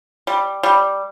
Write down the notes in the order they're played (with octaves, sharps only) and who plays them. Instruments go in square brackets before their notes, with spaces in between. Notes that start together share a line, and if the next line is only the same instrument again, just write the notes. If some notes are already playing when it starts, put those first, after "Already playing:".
[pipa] G3
G3